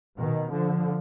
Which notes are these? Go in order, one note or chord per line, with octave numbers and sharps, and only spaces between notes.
B2 D#3
D3 F3